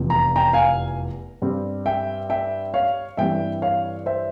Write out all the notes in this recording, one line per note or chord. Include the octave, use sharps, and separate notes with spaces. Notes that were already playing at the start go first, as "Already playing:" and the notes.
Already playing: F1 E2 C3 F3
A#5
G5 A#5
F5 G#5
G2 G3 C4
E5 G5
E5 G5
C#5 F5
G2 E3 G3 C4 E5 G5
C#5 F5
C5 E5